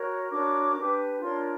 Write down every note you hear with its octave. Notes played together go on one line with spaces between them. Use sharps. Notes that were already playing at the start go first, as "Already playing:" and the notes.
Already playing: F#4 A#4 C#5
D4 F#4 A#4 C#5 D6
D4 G4 B4
D4 F4 A#4 C#5 C6